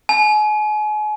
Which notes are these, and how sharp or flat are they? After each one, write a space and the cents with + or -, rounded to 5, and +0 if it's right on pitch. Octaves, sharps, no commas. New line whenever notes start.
G#5 +35